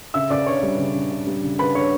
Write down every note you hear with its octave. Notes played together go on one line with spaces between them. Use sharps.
C#3 E5 E6
C#3 D5 D6
D4 C#5 C#6
G3
C#3
C#3
D4
G3
C#3
C#3 B4 B5
D4 C#5 C#6